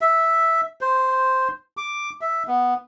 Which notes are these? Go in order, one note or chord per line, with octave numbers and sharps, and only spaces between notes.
E5
C5
D6
E5
B3